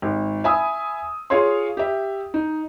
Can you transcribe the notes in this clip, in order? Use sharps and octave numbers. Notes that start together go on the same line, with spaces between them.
G#1
E5 G#5 B5 D#6 E6
F4 G#4 C#5 C6
G4 E5
D#4